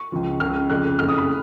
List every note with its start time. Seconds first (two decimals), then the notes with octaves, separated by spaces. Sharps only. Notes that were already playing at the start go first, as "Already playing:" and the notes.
Already playing: C#6
0.12 C#2 C#3 F3
0.40 C#2 C#3 F3 F6
0.69 F1 F2 C#3 F3 F#6
0.99 F#1 F2 C#3 F6
1.09 D#6
1.18 B5